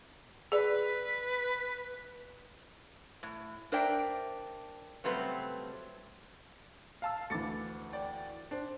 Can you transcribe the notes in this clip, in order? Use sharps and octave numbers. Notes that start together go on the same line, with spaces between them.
G#4 B4 D5
A2
D4 A#4 C5 D5 E5 G5
C#3 F#3 G3 A3 C4 B4
F5 A5 E6
D2 E3 D6 A6 C#7
D5 G5
D4 C5